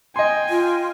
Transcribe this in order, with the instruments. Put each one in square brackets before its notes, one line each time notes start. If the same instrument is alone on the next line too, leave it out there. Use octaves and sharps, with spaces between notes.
[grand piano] D#5 C6 [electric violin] G5 G#5
[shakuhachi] F4